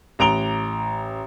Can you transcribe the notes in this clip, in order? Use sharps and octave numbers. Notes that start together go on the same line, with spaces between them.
A1 A#5 D7 F7 G7